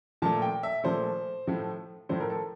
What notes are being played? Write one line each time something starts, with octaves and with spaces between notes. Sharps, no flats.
A#2 F3 A3 A5
G5
E5
A#2 F3 A3 C5
A2 F3 A3
A2 F3 A3 C5
A#4
A4